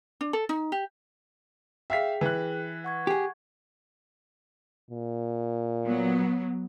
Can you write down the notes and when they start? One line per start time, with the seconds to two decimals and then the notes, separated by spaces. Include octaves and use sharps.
0.21 D4
0.33 A4
0.49 D#4
0.72 G4
1.90 G#4 E5 F5 G5 B6
2.21 E3 F#6
2.84 F#5 C#6 G#6
3.07 G4 G#4
4.91 A#2
5.86 F#3 B3